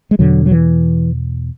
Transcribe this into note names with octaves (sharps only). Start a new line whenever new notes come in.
G#3
E2 B2 D3 F#3
F#3
E3